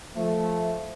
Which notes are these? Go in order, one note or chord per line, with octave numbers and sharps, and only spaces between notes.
F3 A3